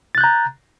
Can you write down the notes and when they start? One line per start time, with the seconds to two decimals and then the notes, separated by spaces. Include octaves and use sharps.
0.15 A6
0.18 F#6
0.21 G6
0.24 A#5